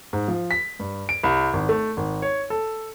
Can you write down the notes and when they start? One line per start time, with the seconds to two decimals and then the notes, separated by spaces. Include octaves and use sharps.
0.13 G#2
0.28 F3
0.51 B6
0.79 G2
1.09 D7
1.23 C2
1.53 G#1
1.69 A3
1.97 G#1
2.22 C#5
2.50 A4